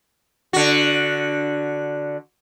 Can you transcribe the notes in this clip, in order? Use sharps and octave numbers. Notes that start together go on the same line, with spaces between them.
D3 F#4